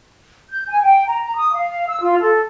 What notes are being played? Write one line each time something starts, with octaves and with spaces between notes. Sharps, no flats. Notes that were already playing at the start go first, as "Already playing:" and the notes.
G6
G#5
G5
A#5
A#5
D#6
F5
E6
F4
A4